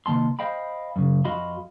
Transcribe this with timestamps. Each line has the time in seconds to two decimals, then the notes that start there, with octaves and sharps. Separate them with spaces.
0.06 C3 D#3 A#3 A5 C6
0.39 C5 D#5 F5 G5 B5
0.96 F#2 C#3
1.24 F2 F#4 D#5 F5 B5 C6